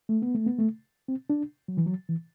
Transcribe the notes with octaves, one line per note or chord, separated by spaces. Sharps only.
A3
B3
A3
B3
A3
C4
D4
F#3
E3
F#3
E3